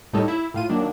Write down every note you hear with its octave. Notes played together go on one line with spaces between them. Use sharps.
A2 G3 D#4 A4 C#5
E4
A2 F4 D#7
D#3 F#3 A#3 D4